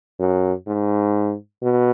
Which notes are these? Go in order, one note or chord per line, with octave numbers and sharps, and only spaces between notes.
F#2
G#2
B2